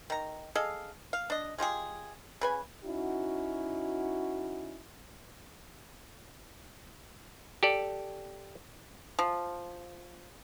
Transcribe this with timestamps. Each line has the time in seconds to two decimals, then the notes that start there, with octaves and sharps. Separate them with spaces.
0.10 D#3 A#5
0.55 G#4 A4 D#5 F5
1.13 F5
1.30 D4 D#5
1.58 G#3 F4 G4 G#4
2.41 C#3 B4 G#5
2.85 C#4 D#4 E4 F#4
7.63 G4 A4 D5
9.19 F3